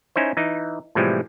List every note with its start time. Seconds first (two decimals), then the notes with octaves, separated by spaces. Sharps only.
0.16 C#4 D#4 E4 C5
0.37 E3 D#4
0.95 A2 C3 E3 F3 G3 G#3